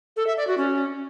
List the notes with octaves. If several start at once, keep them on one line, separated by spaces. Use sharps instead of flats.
A4
E5
D5
F#4
C#4